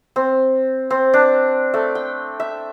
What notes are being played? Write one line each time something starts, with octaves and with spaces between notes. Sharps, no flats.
C4
C4
D4
A3
G5
E5